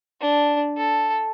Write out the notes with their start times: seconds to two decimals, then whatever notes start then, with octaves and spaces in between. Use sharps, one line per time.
0.21 D4
0.77 A4